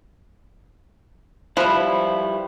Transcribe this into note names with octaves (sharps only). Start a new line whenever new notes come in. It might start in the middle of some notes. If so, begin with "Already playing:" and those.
F3 G3 E4 B4 E5